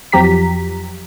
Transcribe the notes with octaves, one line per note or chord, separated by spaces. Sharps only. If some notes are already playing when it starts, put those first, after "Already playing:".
F2 F3 F#3 G4 A#5 B6